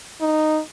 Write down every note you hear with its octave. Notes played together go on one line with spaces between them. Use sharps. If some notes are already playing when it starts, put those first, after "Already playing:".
D#4